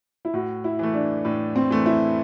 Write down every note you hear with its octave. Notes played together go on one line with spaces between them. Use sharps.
E4
A2 F#4
E4
E3 A3
D4
A2 D4
C4
E3 A3
E4